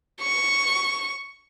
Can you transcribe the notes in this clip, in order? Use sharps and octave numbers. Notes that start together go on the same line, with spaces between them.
C#6